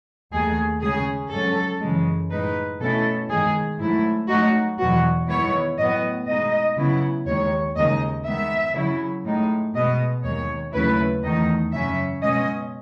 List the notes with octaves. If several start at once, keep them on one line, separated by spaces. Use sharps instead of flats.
D#2 D#3 A3 G#4
C#3 G#3 C#4 G#4
G#2 F#3 C#4 A4
F#2 C#3 E3 G#3
A2 G#3 D#4 B4
B2 A3 C#4 E4 A4
G#2 D#3 G#3 G#4
G#2 F#3 A3 E4
G#2 F#3 A3 D#4 F#4
E2 B2 F#3 B3 F#4
D#3 G#3 B3 E4 C#5
A2 F#3 B3 D#5
B2 G#3 D#4 D#5
C#3 F#3 B3 E4
D#2 D#3 G#3 C#5
D#2 C#3 G#3 D#4 D#5
D#3 G#3 B3 E5
C#3 F#3 C#4 E4
A2 G#3 D#4
B2 G#3 B3 D#5
D#2 D#3 G#3 C#5
D#2 C#3 F#3 A3 E4 B4
E2 D#3 A3 D#4 D#5
F#2 C#3 F#3 C#4 E5
B2 G#3 C#4 D#5